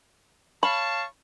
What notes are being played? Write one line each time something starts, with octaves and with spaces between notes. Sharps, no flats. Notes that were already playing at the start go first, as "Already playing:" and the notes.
C#5 F5 A5 B5